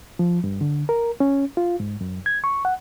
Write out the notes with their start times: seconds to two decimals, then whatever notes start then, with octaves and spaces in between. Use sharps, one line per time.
0.19 F3
0.44 G2
0.61 D3
0.89 A#4
1.20 C#4
1.57 F4
1.80 G#2
2.01 F#2
2.26 G#6
2.44 C#6
2.65 F#5